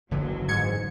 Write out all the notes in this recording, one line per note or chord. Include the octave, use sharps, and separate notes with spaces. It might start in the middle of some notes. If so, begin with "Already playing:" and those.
F#1 D3 E3 F#3
G#2 G#6 C#7